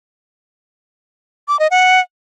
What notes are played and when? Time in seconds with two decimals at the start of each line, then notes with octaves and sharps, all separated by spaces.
1.48 D6
1.59 D#5
1.71 F#5